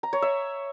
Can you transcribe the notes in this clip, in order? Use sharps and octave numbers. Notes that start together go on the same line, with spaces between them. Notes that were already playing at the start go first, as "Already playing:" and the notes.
A#5
C#5
E5